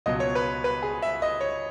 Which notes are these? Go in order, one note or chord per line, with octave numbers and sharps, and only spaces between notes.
C#2 B2 F#3 D#5
C#5
B4
B4
G#4
E5
D#5
C#5